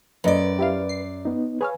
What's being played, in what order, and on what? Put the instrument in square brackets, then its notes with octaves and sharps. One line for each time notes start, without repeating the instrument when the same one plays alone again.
[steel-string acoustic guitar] F#2 D5 [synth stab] A#2 D#5 [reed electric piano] B4
[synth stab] G3 E4 F5
C7
[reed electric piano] B3 D#4
[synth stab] G#4 C#5 F5 [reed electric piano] B4 G#5